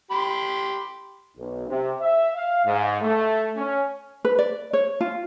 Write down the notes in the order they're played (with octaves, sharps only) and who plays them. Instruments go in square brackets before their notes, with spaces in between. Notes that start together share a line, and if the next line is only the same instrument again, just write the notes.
[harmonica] G4 B5 C6
[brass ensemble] B1
C3
E5
F5
G#2
A3
C#4
[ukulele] B4
D5
C#5
F4